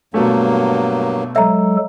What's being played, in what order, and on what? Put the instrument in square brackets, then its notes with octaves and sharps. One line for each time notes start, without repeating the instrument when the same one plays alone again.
[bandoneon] G2 F#3 A#3 [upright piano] B2 A3
[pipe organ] F#3 G#3 A4 [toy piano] E5 A#5